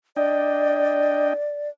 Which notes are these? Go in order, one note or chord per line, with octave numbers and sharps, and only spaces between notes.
D4 D5 D#5 G5